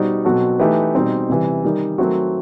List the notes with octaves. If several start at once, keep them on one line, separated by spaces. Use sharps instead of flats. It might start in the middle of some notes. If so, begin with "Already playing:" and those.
Already playing: B2 G3 D#4 F#4 C5
B2 F#3 C4 F#4 A4
E3 A3 D#4 G4 B4
B2 G3 C4 D#4
C3 E3 G3
D#3 G3 D#4
D#3 F#3 A3 C4 F#4